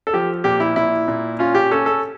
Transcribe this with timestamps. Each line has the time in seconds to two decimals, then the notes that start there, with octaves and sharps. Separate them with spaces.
0.07 A4
0.13 F3 G4
0.44 A#2 G4
0.60 E4
0.76 A#2 E4
1.08 A#2
1.39 C#4 F4
1.55 G4
1.71 C#4 A4
1.86 A4